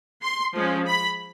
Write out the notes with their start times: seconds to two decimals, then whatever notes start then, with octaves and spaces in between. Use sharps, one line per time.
0.23 C6
0.55 F3 G#3 C#4
0.86 B5